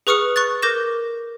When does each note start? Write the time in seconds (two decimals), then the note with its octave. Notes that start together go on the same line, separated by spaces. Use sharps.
0.07 G#4 B4 C#6 D#6 F6 C#7
0.36 C#6 F#6 A6
0.62 A#4 D6 G6 A#6 E7